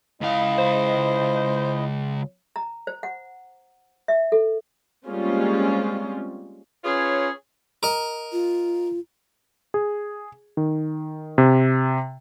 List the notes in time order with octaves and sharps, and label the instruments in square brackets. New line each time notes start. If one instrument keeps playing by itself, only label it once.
[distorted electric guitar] C#2 F5 [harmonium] E4 D#5
[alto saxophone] C5
[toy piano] A#5
C5
F#5
E5
A4
[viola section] G3 G#3 A#3 C4 C#4 F4
[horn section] C#4 F4 G#4 B4 C#5
[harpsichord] A#4 D#5
[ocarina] F4
[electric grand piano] G#4
D#3
C3